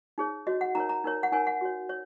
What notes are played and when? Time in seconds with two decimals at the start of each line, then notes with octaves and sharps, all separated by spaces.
0.18 D#4 G#4 C#5
0.47 F#4 C#5 D#5
0.61 F#5
0.75 D#4 A#4 C#5 A#5
0.89 A#5
1.04 D#4 A#4 C#5
1.23 F#5
1.32 D#4 A#4 C#5 G#5
1.47 F#5
1.61 F#4 C#5
1.89 C#5